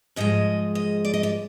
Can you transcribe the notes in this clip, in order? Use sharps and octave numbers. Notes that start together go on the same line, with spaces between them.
G#2 F3 G#3 D#5
D#5
D5
D#5
D5